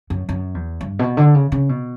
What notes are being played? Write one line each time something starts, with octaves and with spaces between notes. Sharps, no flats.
F#2
F#2
E2
G2
B2
D3
C#3
C#3
B2